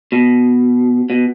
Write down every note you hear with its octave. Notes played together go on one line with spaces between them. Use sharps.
B2
B2